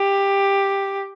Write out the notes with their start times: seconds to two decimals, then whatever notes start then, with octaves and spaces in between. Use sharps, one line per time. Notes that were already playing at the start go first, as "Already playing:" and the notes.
Already playing: G4